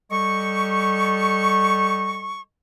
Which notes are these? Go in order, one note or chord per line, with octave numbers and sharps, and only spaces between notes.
G3 A4 D#5 C#6